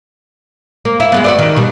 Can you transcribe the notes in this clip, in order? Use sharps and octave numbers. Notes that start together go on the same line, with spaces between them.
A#3
E4 F4 E5
G#3 A3 B3
F#4 B4 D5
D#3
B2 G3